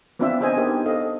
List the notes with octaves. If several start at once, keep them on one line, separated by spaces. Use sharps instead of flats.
B3 C4 D4 F4 D5 E5
D4 G#4 C5 D#5 G#5
B3 D4 D#4 G4 A#4
A4 C5 D#5 F5